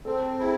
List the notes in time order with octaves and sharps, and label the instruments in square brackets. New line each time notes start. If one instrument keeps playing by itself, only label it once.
[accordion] C4 [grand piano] A4
[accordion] E4 [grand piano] G#4